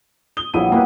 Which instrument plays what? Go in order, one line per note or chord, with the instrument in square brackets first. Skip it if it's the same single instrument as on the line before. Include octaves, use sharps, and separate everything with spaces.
[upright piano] D#6 G7
[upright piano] A#1 E4 D#7 [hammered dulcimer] B2 F#3 G3
[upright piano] A#3 E4 B4 [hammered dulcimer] B3 D#5 F5